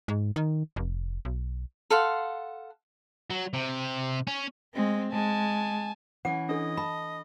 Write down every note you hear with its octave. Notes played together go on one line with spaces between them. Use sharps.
G#2
D#3
F1
B1
A4 F5 F#5 C6
F#3
C3
C#4
G#3 C4
G#3 G#5 A5
E3 C#4 F#5
D4 A4 D#5
A5 B5